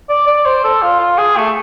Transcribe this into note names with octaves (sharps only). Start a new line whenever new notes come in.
D5
D5
C5
A4
F4
F4
G#4
A3